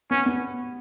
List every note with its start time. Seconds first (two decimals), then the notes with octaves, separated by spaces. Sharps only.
0.11 B3 C#4
0.26 B3